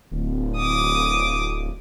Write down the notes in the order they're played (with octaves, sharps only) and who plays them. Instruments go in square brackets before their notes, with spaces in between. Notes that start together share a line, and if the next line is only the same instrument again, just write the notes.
[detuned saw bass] D1
[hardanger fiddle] D6 D#6